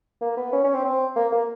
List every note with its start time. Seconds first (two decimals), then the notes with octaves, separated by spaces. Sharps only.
0.21 A#3
0.37 B3
0.53 C#4
0.64 C#4
0.74 C4
0.85 C4
1.16 A#3
1.32 A#3